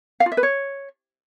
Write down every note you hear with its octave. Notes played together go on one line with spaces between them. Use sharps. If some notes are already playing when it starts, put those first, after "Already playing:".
F5
F4
E5
B4
C#5